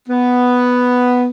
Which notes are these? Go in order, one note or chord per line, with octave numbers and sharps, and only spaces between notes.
B3